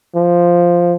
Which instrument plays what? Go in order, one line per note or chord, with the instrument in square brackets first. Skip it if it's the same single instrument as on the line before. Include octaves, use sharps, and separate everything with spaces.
[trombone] F3